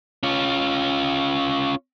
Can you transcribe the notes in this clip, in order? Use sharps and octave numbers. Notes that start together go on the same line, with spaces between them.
C#4 F4